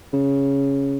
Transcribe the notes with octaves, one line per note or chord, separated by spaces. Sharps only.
C#3